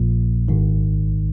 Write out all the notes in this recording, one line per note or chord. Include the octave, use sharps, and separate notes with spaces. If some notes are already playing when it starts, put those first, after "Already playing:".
Already playing: A#1 A#2 F3
G#1 G#2 D#3